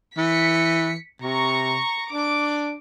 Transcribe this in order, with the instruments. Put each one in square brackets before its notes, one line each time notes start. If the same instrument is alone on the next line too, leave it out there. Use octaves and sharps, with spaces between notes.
[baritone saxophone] E3 [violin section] B6 C#7
[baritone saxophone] C3 [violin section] A#5 C#6
[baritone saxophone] D4 [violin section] D6